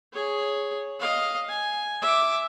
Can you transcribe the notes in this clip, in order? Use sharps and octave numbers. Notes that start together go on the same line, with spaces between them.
G#4 C#5
D#5 F5
G#5
E5 D6